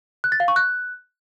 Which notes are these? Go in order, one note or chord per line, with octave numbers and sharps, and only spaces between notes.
F#6
A6
F5
C#6
F#6